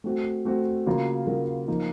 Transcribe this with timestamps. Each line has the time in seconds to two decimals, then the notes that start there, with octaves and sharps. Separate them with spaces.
0.04 A3 C4 F#4
0.45 A3 C4 F#4
0.86 C#3 F#3 A#3 F4 A#4
1.27 C#3 F#3 A#3 F4 A#4
1.68 F3 A#3 D#4 A#4